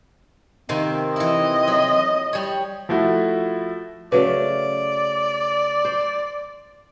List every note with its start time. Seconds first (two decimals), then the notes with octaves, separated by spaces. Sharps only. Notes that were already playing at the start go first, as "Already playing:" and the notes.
0.69 C3 D#3 A#3 C4
1.16 E3 E4 D#5
1.68 F#3
2.33 G3 C#5
2.89 F3 A3 E4 F#4
4.12 C#3 F#3 A3 B4 D5
5.85 C5